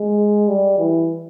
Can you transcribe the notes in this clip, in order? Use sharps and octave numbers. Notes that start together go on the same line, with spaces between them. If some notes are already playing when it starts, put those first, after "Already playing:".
Already playing: G#3
G3
E3